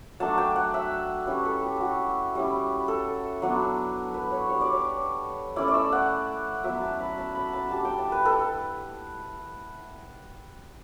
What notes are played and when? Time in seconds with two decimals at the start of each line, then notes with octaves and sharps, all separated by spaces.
0.20 F#3 A3 D4 A5
0.38 G5
0.56 F#5
0.74 E5
1.27 G3 C#4 E4 B4
1.45 A4
1.63 G4
1.81 F#4
2.35 G3 C#4 E4
2.88 A4
3.42 F#3 B3 D4
4.14 B4
4.31 C#5
4.49 G3 D4 C#5
4.61 D5
4.72 C#5
5.56 A3 C#4 E4 D5
5.68 D5
5.74 E5
5.92 F#5
6.64 F#3 B3 E4 E5
6.82 A5
7.00 B5
7.18 A5
7.35 B5
7.53 A5
7.71 G3 D4 A5
7.85 G5
7.98 A5
8.12 B4
8.25 A4